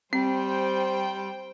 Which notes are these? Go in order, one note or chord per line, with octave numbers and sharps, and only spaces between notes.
G3 C4 C5 G5